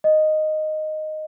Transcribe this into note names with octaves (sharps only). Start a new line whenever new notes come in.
D#5